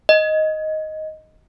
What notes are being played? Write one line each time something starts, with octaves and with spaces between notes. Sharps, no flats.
D#5